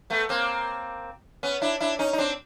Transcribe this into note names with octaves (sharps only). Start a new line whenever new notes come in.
A3 B3
A#3 C4
B3 C#4
D4 E4
D4 E4
C#4 D#4
D#4
C4 D4